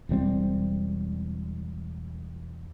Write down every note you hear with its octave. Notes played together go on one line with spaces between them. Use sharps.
E1 G2 G3 C4